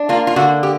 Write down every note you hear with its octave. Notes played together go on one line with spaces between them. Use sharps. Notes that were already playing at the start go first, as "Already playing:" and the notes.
Already playing: D4
A#3 F4
F4
D3 F#4
G4